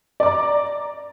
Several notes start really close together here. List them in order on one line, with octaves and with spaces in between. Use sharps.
D5 D6 A#5